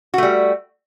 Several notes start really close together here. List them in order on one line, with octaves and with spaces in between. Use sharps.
F#4 A3 G3